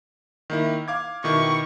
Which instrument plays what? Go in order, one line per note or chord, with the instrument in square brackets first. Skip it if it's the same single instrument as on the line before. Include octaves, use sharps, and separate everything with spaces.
[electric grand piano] D#3 A#3 E4
F5 D6 G#6
[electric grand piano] B2 D#3 E4 [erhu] C#6